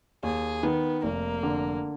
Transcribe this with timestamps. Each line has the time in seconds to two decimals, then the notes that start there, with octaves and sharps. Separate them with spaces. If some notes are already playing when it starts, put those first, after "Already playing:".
0.23 D#2 G#4
0.63 D#3 B3
1.03 F1 A#3
1.43 D3